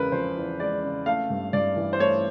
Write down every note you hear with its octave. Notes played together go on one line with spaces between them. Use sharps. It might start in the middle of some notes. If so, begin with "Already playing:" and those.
Already playing: E2 C#3 G#3 A#4 B4
F3 C5
E2
G#3 D5
C#3
A3 F5
G2
G2 D5
E3
C5
A3 C#5